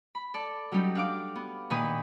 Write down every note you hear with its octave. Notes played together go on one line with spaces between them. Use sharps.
B5
A4 D5
F#3 G3 C#4 D#4 G4
D4 F5 D6
B3
A#2 D#3 B4 D#6